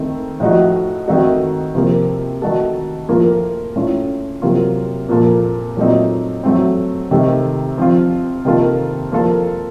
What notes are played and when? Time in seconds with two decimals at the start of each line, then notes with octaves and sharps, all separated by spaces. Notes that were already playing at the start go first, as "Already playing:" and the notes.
Already playing: D#3 A3 C4
0.40 A2 F3 A3 D#4 F#4
1.08 D#3 A3 C4 D#4 F#4
1.75 C3 F3 A#3
2.42 D#3 A3 D#4 F#4 A4
3.08 A2 F3 A#3 F4 A4
3.76 A2 A3 C#4 F4
4.42 C3 F#3 A#3 F4
5.09 A#2 F3 A#3 F4 A4
5.77 A#2 F#3 A3 C4 D#4
6.44 F#3 A3 C4
7.11 C3 D#3 A3
7.78 F3 C4 F4
8.45 C3 D#3 A#3 F4 A4
9.11 F3 A#3 F4 A4